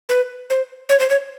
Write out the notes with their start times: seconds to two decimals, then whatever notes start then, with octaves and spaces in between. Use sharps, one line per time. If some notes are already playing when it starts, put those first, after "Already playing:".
0.09 B4
0.50 C5
0.89 C#5
1.00 C5
1.10 C#5